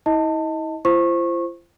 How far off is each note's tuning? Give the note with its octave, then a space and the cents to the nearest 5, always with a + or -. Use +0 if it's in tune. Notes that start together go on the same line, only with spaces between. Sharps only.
E4 -40 D#5 +20 A5 +20
F4 -40 C5 +0 C#6 -20